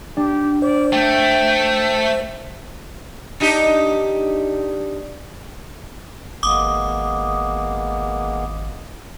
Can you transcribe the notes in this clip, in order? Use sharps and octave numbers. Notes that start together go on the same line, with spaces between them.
D4 G4
C5 D5
A3 G5
D4 D#4 G4
G#1 G#3 A#3 B3 D6 D#6